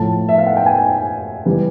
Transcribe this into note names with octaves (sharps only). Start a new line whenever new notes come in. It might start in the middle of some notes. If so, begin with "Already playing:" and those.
Already playing: A2 F3 A3 A5
E5
F5
F#5
G5
G#5
E3 G3